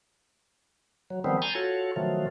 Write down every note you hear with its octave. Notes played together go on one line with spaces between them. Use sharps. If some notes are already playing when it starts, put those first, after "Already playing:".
F#3
D#3 F3 G3 B3 C4
G#5 A#5 C6 C#6 G6 A6
F4 F#4 A4 C#5
B2 D#3 F3 F#3 A3 F4